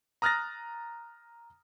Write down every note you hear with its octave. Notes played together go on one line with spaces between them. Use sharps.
A#5 D#6 F6 F#6 A6 A#6